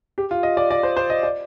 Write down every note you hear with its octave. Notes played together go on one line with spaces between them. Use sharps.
G4
F4
D#5
D5
D5
C5
C5
D#5
D5